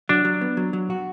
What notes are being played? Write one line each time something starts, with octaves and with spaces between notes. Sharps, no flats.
F#3 D4
F#3
B3
F#3
F#3
F#4